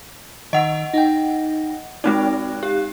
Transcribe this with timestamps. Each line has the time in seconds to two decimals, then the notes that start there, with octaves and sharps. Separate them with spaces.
0.53 D#3 D#5 F#5
0.94 D#4 G5
2.04 G#3 C4 D#4 D5 F#6
2.63 G4